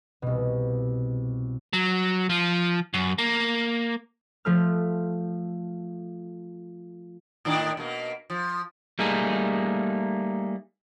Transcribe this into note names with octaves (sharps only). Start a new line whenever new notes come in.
C2 B2
F#3
F3
F#2
A#3
F3 A3 F6
A2 D#3 D4
B2 A#3
F3
G3 A3 A#3 D#4 G#4